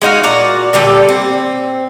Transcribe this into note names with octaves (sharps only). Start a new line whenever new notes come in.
G#3 D#4 F#4 F5
A#2 F#4 D5 A#5
A#2 D3 G3 A4
C4